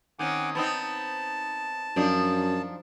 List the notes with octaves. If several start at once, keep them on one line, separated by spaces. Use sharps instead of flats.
D#3 C4 C#4 F#5 G#5 D6
B3 C4 D#4 A5
F#2 F3 D4 D#4